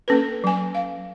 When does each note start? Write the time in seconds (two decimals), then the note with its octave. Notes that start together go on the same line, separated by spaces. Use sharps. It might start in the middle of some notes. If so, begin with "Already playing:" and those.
0.08 A#3 C#4 A4 B4
0.44 F#3 G#5
0.75 F5